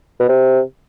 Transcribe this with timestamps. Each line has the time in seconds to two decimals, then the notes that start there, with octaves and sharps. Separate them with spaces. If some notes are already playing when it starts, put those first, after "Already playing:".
0.20 B2
0.29 C3